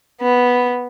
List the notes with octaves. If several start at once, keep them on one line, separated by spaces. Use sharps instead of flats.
B3